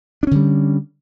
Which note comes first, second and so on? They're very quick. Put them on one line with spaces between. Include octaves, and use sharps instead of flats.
D4 C#4 D3 G3